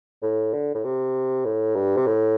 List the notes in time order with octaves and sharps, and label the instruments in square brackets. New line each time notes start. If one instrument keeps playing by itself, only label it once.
[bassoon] A2
D3
A2
C3
A2
G2
C3
A2